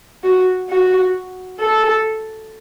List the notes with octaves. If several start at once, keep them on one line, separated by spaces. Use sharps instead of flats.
F#4
F#4
A4